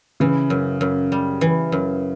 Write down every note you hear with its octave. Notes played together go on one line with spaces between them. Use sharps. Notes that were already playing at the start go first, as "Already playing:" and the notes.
C#3 E3
F#2
F#2
G3
E3
F#2